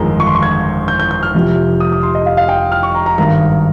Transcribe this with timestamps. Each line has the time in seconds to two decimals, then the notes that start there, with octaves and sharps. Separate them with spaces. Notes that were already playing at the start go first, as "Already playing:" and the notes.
Already playing: G1 F2 D#3 G#3 A#5
0.20 C#6
0.27 C6
0.35 C#6
0.43 G#6
0.88 G6
1.00 G6
1.11 G6
1.23 F6
1.35 F1 F2 C3 F3
1.80 D#6
1.92 D#6
2.03 C6
2.15 D#5
2.26 F5
2.37 F5
2.49 G5
2.72 F6
2.83 C#6
2.95 A#5
3.06 A#5
3.18 G#1 G2 D#3 A#5